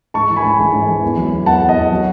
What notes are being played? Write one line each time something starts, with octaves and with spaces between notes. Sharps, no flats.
G#2 A5 C#6
E3
G#5 B5
G#2
G#2
G#2
E3
E2
F#3
E2
E2 F#5 A5
E2
D#5 F#5
E2
F#3